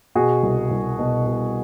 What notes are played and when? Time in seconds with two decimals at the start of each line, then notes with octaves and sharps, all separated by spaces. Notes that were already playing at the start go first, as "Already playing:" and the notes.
0.15 B2 F#4 G#4
0.43 C2
0.71 C2
0.99 B2
1.26 B2